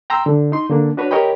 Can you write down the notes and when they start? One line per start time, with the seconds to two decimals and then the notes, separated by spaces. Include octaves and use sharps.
0.10 G5 A#5 C6 E6
0.26 D3
0.52 D#4 C6
0.69 D3 A#3 D4
0.97 D4 F#4 B4 C#5
1.11 G4 A#4 C#5 D#5 G5 B5